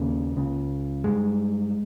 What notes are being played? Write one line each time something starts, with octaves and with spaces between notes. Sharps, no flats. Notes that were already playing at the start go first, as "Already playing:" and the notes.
Already playing: D#2 C#3 A#3
C#2 C#3
G2 G#3